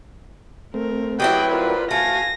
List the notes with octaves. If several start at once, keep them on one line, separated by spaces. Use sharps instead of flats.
A3 C4 A#4
F#3 C4 E4 G4 B4 G5 D6 D#6
F4 A#4 C5 D5
A3 F#4 F5 G#5 A#6